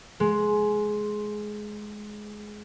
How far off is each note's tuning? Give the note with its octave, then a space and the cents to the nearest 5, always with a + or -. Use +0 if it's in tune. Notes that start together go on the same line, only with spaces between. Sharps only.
G#3 +15